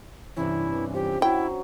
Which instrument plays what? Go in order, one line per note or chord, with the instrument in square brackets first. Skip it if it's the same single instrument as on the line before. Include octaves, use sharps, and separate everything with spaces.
[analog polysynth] G2 C3 E3 [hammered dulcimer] C#4 D4 [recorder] E4
[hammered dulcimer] F3 [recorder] G4
[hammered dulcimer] F#3 [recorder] E4 [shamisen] G5